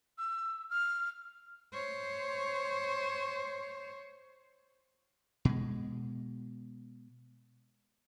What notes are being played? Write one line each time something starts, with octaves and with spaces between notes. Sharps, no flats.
E6
F6
C5 C#5
B2 G#3